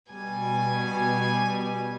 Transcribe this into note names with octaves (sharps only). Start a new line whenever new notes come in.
B2 G3 G#5